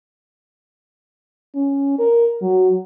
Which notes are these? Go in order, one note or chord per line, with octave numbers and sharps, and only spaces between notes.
C#4
A#4
F#3